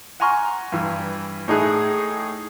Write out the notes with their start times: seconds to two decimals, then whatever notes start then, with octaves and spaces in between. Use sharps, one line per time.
0.20 F#5 G#5 A#5 C6 C#6 F6
0.72 G2 E3
1.48 A2 D#4 E4 G#4 F#6